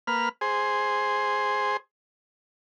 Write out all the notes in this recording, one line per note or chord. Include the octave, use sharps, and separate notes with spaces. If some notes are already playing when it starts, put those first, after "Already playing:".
A#3 B4 F6
G#4 C5